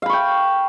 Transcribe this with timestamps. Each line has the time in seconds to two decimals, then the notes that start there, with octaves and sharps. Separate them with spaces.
0.02 F5
0.06 B5
0.09 C#6
0.13 G5